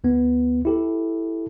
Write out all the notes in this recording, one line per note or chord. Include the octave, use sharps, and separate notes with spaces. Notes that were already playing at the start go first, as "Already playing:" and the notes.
D2 B3
E4 G4 A4